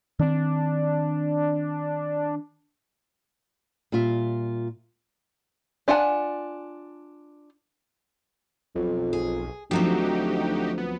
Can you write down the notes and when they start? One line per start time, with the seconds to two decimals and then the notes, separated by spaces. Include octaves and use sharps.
0.19 D#3 C4 D4
3.92 A#2 G3 F4 E5
5.88 D4 F4 F#5 G#5 A5
8.75 B1 F2
9.13 G#4
9.71 D2 F3 F#3 C4 D#4 F#4 G4
10.78 B3